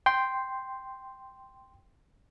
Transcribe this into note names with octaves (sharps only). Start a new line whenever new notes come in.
G5 C6